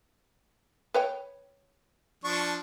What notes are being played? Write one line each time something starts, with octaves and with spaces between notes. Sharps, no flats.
B4 C#5 G5
F3 D4 C#6